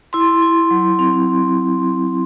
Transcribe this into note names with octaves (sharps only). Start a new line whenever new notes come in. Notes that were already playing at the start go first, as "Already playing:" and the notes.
E4 C6
E4
F#3
C4